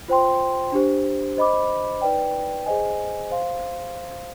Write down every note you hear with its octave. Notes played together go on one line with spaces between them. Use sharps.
F4 C5 G5 C6
D4 G4 C5
C5 D#5 B5 D6
D#4 B4 D5 G5
G#4 C5 D#5 G#5
C5 F5 C6